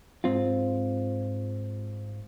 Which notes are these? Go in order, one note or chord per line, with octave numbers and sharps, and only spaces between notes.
G#2 C4 F4